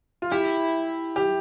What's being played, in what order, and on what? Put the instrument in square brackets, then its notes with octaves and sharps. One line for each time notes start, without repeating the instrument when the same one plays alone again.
[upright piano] F4
[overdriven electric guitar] E4 [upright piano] G4
[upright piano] G4